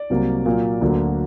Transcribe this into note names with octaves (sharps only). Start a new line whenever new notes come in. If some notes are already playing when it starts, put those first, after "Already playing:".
Already playing: D5
C2 C3 F#3 A#3
A#2 F#3 A#3
D2 D3 F#3 A#3